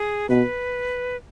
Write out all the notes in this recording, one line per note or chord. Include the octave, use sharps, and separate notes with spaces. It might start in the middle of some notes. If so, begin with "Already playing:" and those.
Already playing: G#4
B2 B4